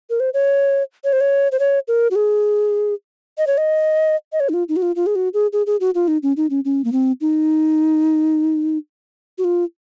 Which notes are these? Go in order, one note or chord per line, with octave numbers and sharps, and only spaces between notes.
A#4
C5
C#5
C#5
C5
C#5
C5
C#5
A#4
F#4
G#4
D#5
C#5
D#5
D#5
C#5
D#4
F4
D#4
F#4
F4
F4
G#4
F#4
G#4
G#4
G#4
F#4
F4
D#4
C#4
D#4
C#4
C#4
A#3
C4
D#4
F#4
F4